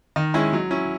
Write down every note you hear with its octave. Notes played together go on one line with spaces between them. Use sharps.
D#3
G#3 C#4 E4
F#3
C#4 E4